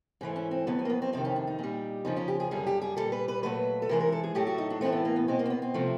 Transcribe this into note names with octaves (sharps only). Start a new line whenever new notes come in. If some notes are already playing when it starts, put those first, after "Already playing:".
G#2 E3 A3 D4
C#4
C4
F2 D3 F#3 B3
C4
A#3
B3
C4
F2 C3 D#3 C4
C#4
D4
D#4
A#2 G3
F2 C#3 F3 D#4
C#4
G4
G#4
F#2 D3 G3 G#4
G4
G#4
A#2 G3 A4
B4
B4
A#2 F#3 A3 B4
A4
C3 E3 G#3 A#4
A#4
A4
G#4
A2 F#3 A3 G4
F#4
D#4
D4
A2 E3 A3 C4
B3
A#3
B3
B2 G#3 C4
A#3
C4
B3
C4
C3 F3 A3